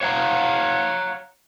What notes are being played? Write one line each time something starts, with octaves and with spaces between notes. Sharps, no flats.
C#5 F5 F#5 A#5